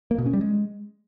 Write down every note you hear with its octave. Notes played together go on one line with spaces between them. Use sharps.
A#3
B2
C#4
G3
G#3